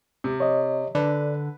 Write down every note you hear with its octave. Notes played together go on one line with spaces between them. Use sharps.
C3
C#5 D#5
D3 B4 D5